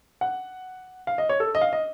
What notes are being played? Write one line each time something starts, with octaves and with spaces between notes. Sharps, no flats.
F#5
F5
D#5
C#5
A4
D#5
F5
D#5